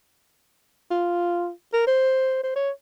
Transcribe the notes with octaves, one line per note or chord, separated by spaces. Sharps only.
F4
A#4
C5
C5
C#5